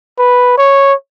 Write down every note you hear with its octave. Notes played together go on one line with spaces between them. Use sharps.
B4
C#5